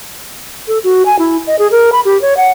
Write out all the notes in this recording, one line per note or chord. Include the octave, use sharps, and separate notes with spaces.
A4
F#4
G#5
E4
D#5
G#4
A#4
B5
G4
C#5
F#5